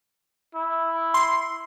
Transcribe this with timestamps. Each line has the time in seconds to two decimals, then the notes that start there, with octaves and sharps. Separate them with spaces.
0.55 E4
1.14 C6